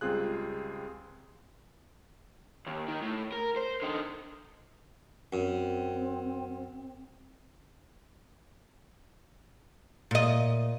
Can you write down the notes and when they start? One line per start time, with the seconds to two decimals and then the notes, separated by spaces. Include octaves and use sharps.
0.01 C#2 G3 C4 F4 G#4 F#6
2.67 D#2
2.88 D#3
3.02 A2
3.32 A#4
3.57 C5
3.82 D3 D#4
5.33 F#2 C4
10.11 A#2 D#5